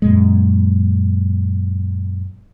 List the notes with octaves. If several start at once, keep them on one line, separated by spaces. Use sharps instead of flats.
F#2 A#2 G#3